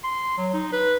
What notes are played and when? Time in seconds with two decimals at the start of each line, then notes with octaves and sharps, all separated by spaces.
0.04 C6
0.37 F#3
0.53 D#4
0.72 B4